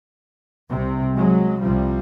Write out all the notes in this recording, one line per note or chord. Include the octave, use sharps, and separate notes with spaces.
C2 C3
F#3 G#3
C2 C3 F3 G3